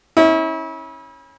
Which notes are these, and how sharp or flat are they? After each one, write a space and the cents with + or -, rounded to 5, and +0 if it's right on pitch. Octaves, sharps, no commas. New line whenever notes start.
C#4 -20 E4 -35